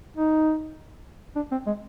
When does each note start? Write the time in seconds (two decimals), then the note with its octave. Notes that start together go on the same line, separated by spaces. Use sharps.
0.17 D#4
1.36 D4
1.51 C4
1.66 G#3